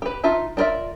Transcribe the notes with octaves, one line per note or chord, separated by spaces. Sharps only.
G4 B4
D#4 F4 E5 A5
D4 F4 A#4 D5 E5